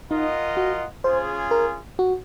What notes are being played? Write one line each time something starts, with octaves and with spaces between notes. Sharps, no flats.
D#4 F4 A#4 D#5 F#5
F#4
C#4 F4 G#4 C5
A#4
F#4